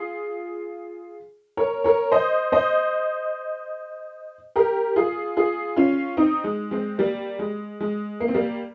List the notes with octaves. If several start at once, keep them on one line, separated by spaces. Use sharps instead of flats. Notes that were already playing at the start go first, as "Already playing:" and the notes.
Already playing: F4 G#4
A#4 C#5
A#4 C#5
C5 D#5
C5 D#5
G4 A#4
F4 G#4
F4 G#4
C#4 F4
C4 D#4
G#3
G#3 C4
G3 A#3
G#3
G#3
A#3
C4
G3 A#3